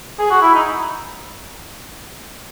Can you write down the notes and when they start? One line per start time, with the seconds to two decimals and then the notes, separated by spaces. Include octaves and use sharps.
0.19 G#4
0.30 F#4
0.42 E4
0.54 D#4